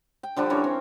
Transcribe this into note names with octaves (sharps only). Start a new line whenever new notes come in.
G5
D3 F3 G3 D4
E3 C#4 A#4 C#5
C4